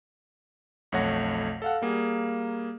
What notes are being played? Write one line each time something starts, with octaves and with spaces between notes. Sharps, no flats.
B1 F2 A3 C#5 F#5 A#6
A4 F5 F#5
G3 A#3 G#4